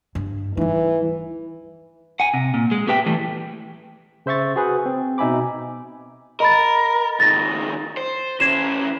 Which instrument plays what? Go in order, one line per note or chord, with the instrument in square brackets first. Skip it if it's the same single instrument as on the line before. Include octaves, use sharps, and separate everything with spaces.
[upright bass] G2
[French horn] E3 [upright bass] G3 D#4
[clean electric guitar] F#5 G#5
C3
A#2
G#3
B3 G4 B4 E5 G5
E3 G3 A3
[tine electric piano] C#3 C5 E5 C#6 A6
F#4 G#4 B4
C4
B2 D#4 E5 G#5 B5 D6
[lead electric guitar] A#4 [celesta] D#5 B5 A6
[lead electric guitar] C#2 D#3 [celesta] A6 A#6
[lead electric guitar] C5
[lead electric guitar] E3 C#4 [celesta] G#6 C7 E7